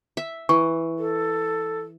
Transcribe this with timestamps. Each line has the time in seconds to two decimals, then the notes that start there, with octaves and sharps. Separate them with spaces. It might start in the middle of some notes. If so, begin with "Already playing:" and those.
0.17 E5
0.49 E3 C#6
0.99 A4